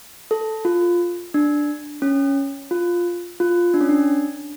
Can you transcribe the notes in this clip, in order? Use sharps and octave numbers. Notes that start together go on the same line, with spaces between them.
A4
F4
D4
C#4
F4
F4
D4
C#4
D4